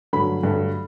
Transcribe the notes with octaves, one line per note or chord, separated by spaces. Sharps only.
G2 D3 F#3 A3 B5
G2 D3 F#3 A3